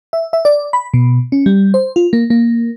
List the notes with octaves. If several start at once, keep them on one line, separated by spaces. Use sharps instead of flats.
E5
E5
D5
B5
B2
C#4
G3
C5
F4
A#3
A#3